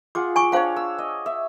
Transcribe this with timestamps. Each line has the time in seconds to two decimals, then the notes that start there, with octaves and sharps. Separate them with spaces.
0.15 F4 G#4 F#5 D6
0.36 G#5 C#6 D6
0.52 D4 C5 C#5 F5 G5
0.76 E6
0.99 D#5
1.26 E5